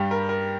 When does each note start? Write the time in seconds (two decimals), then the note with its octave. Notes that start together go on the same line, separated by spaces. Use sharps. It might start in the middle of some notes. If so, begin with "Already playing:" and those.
Already playing: G2 G3 G4
0.11 A#4
0.29 A#4